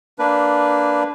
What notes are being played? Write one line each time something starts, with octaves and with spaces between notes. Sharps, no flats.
A#3 D4 B4